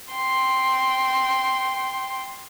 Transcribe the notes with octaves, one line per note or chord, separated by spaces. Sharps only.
G5 C6